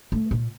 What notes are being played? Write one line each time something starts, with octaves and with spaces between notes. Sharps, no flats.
A3
A#2